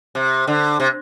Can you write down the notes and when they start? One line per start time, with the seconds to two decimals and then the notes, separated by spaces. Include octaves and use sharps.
0.15 C3
0.48 D3
0.80 C3